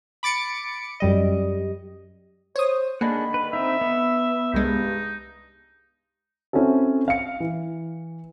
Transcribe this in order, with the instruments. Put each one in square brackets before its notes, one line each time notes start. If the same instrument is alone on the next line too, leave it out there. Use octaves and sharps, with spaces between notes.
[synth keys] B5 D6 A6 C#7 D7
F#2 G3 D#5
[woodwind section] C5 [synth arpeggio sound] C#5 D#6
[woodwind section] D3 D#3 B5 [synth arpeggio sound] A#3 [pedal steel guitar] D4 G#4 F#5
[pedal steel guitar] B4
[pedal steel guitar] C4 D#4 [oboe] E5
[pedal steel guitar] B3
[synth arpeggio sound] C2 G#3 [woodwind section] G2 [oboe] D#4
[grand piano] C4 C#4 E4 F#4 A4
F5 C#7
E3